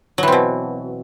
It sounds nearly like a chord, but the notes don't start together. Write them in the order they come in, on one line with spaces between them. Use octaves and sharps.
F#3 E3 C4 B2